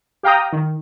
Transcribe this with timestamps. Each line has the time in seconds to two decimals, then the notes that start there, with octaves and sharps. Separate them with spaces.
0.23 G4 F5 G5 A#5 D#6
0.52 D#3